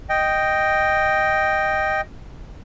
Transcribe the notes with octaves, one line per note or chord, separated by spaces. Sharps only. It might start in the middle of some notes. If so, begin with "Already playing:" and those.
D#5 G5